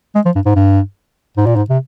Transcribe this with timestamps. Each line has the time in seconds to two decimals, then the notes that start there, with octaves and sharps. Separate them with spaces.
0.15 G#3
0.25 F3
0.35 G2
0.46 G#2
0.56 G2
1.37 G#2
1.46 A#2
1.56 G#2
1.70 C3